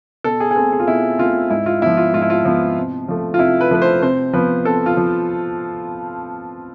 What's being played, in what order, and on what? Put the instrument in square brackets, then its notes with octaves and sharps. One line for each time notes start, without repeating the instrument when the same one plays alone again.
[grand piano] B2 A4
G#4
G#4
A3 C4 A4
G#4
F4
B2 E4
A3 C4 F4
G#2 E4
F4
F3 B3 E4
F4
G#2 F4
E4
F4
F3 B3
C3
F3 A3
F4
C3 E4
B4
F3 A3 B4
C5
C3 C5
F3 B3 B4
C3 A4
F4
F3